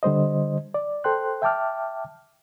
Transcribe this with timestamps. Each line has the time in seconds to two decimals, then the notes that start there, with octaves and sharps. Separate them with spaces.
0.03 D3 G3 C5 D#5
0.74 D5
1.04 A4 C5 G5 C6 F#6
1.42 E5 G5 A5 D6 F6